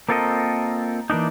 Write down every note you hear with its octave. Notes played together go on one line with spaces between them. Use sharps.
A#3 C4 F4 A4 A#4 D#5
E3 A#3 D4 D#4